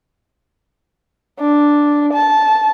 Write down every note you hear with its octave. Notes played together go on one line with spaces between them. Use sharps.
D4
A5